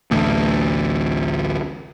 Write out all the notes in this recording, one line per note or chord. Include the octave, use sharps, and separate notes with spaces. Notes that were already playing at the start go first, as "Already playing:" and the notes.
A1 D2